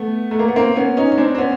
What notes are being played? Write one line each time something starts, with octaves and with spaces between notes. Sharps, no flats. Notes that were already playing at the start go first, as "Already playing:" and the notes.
Already playing: A3 B3
A3
A#3
B3
A#3 C4
B3 C#4
C#4 D#4
C#4
C4 D4
C4
B3 C#4